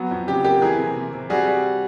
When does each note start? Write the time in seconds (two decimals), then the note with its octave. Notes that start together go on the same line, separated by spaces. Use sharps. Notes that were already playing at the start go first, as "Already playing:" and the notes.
Already playing: F#3 B3 F#4
0.11 F2
0.28 C#3 G4
0.44 A#3 G4
0.62 E3 G#4 A#4
0.79 C3
0.96 C3
1.13 C3
1.30 G3 F#4 G#4
1.47 G3